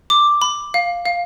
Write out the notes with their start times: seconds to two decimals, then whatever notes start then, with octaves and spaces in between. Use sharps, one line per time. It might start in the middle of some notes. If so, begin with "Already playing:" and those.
0.10 D6
0.42 B5
0.74 F5
1.06 F5